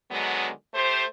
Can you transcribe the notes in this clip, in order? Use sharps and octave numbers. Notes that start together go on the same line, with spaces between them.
D3 D#3 F#3 G#3 B3
A3 G4 C5